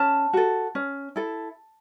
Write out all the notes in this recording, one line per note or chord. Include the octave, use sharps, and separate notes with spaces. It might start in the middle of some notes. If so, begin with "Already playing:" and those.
Already playing: C#4 A5
F#4 A4
C#4
E4 A4